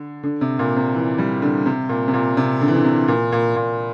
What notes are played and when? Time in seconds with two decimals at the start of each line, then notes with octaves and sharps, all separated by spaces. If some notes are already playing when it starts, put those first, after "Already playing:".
Already playing: D3
0.23 D3
0.41 C3
0.59 A#2
0.76 C3
0.95 E3
1.18 G3
1.42 D3
1.66 C3
1.89 A#2
2.08 C3
2.14 A#2
2.37 C3
2.61 D3
2.68 E3
2.75 D3
2.84 C3
3.08 A#2
3.32 A#2
3.56 A#2